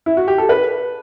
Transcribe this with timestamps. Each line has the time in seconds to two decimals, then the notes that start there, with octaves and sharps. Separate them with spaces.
0.06 E4
0.17 F#4
0.28 G4
0.38 A4
0.49 B4